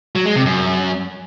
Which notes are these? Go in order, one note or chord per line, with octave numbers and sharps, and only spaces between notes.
F#3
G#3
C3
F#2